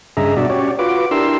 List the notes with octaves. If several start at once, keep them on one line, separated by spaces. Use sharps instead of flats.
G2 C#3 G#4 D#5 E5 A#5
B2 D4 F#4 D5 E5
C#4 F#4 G4 C#5 D5
F4 F#4 B4 D6
D4 E4 G4 A#4 C6 E6